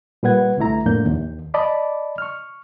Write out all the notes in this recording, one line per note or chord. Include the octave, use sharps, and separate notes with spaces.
A#2 G3 B4 F#5 G#6
C2 D3 A3 E4 A#5
F2 A2 F3 A#3 D4 G6
D#2
D5 D#5 A5 B5 D6
C#6 F6